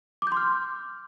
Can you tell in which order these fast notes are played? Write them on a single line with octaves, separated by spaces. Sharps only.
D6 G6 C6 F6